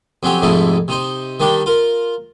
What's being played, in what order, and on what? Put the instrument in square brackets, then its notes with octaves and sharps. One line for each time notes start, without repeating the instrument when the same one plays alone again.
[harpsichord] F2 F#3 C4 C#4 G4
F2 G#2 C3 A3 D#4 E4
C3 D#4 C5
D#3 G3 D4 G4
F4 A#4